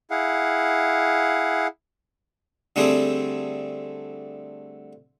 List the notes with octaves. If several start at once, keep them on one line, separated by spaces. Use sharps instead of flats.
E4 G#4 F5 F#5
D3 G3 A3 C4 G#4